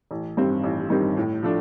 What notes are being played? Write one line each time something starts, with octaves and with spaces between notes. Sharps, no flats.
A1
G2 D#3 G3 C4
A1
G2 D#3 G3 C4
A2
F3 A3 D4